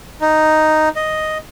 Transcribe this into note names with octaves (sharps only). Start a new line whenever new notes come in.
D#4
D#5